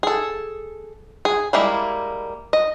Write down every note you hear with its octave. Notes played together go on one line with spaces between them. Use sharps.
G#4 A4
G#4
G3 G#3 A#3 E4
D#5